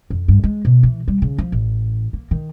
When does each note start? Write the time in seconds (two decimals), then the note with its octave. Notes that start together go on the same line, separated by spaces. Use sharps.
0.10 F2
0.28 G2
0.44 G#3
0.65 B2
0.83 E3
1.08 G3
1.22 C#3
1.38 F3
1.52 A1
2.13 A#3
2.31 D#3